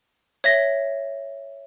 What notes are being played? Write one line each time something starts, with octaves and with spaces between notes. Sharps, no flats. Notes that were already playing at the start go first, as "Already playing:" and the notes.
C#5 E5 A#6